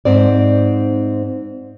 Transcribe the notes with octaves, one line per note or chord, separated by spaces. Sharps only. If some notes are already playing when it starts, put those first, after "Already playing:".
G#2 C4 D5